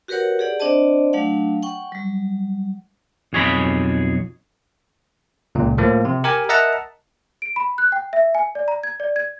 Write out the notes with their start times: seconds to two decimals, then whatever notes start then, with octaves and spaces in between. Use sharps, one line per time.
0.08 F#4 G4 A#4 B4 C#5 F#5
0.39 G4 G#4 D5 F#5
0.60 C4 D4 C5 D5 D#5 A5
1.13 F#3 A3 D4 F5 F#5
1.63 F#5 G5 C#6
1.92 F#3 G3
3.33 B1 F2 G#4 C#5 D#5 B5
5.55 C#2 A#2
5.78 A2 F3 A#3
6.05 C3
6.24 G4 A#4 G#5
6.49 A#4 D#5 E5 F#5 A5 A#5
7.42 D7
7.56 B5
7.78 F#6
7.92 G5
8.13 E5
8.35 G#5
8.55 D5
8.68 A#5
8.83 G#6
9.00 D5
9.16 G#6